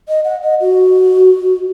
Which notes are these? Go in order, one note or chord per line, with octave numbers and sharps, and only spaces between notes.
D#5
F#5
D#5
F#4